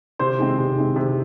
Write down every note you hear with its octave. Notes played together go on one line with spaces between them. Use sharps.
C3 C5 C6
D#3 G#3 C4
C3
D#3 G#3 C4
C3